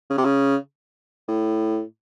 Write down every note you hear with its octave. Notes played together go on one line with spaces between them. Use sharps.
C#3
C3
C#3
A2